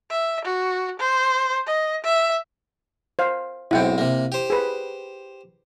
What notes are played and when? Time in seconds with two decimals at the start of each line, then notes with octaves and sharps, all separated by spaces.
0.11 E5
0.45 F#4
1.00 C5
1.67 D#5
2.04 E5
3.19 C5 F5
3.71 B1 G#2 C4 E4 F#5 G5
3.98 C3 A#3
4.32 G4 C5
4.50 G#4 B4